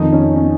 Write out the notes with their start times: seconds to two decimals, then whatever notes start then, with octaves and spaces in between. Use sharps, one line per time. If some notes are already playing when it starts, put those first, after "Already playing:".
Already playing: F2 D#3 D#4
0.13 C#4
0.36 C#4